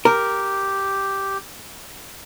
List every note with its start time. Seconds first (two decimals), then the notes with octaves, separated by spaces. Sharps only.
0.05 G4 A#4